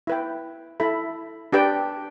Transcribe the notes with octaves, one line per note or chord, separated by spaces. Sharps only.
E4 B4 G5
E4 A4 E5 B5
D4 G4 B4 D5 G5